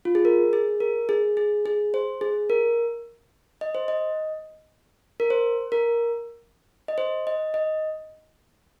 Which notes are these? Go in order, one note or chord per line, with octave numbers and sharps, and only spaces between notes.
F4
G#4
A#4
G#4
A#4
G#4
G#4
G#4
C5
G#4
A#4
D#5
C5
D#5
A#4
C5
A#4
D#5
C5
D#5
D#5